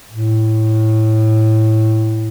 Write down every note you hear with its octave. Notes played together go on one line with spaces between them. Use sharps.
A2